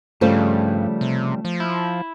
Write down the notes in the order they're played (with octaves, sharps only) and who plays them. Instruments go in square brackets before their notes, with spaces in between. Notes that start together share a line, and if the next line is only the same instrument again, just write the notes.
[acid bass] G2 [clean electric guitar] C#3 F3 G3 [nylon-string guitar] A3 F4 C5
[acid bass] C3
F3
[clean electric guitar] E4